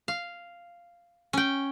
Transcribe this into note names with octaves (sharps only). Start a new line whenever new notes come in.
F5
C#4 G5